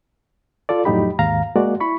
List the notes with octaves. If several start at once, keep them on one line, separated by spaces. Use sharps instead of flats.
F4 A4 D5
F2 A2 F#3 D#4 G4 B5
D#2 G#2 F5 A#5
G#3 A#3 F#4 D5
E4 B5 C#6